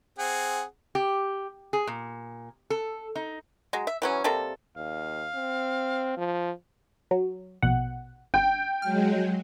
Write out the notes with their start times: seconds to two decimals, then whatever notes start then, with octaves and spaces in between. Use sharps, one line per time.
0.18 C4 G#4 F#5
0.95 G4
1.73 G#4
1.87 A#2
2.70 A4
3.16 D#4
3.73 F#3 G#3
3.87 E5
4.02 E3 F#3 C#4
4.24 C3 G3 A#3 A4
4.76 D#2 F5
5.35 C4
6.17 F3
7.11 F#3
7.62 A#1 B2 F#5
8.34 G1 G5
8.82 F#3 G#3 F6